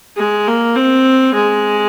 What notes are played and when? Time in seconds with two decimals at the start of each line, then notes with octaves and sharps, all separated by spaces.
0.17 G#3
0.47 A#3
0.75 C4
1.34 G#3